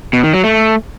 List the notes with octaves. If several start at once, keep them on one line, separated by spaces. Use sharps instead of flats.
B2
D#3
F#3
A3